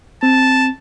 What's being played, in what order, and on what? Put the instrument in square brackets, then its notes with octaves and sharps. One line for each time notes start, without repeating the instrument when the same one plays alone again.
[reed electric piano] C4 [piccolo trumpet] A5